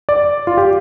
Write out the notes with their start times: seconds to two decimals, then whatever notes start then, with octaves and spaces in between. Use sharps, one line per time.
0.09 D5
0.47 F4
0.57 G4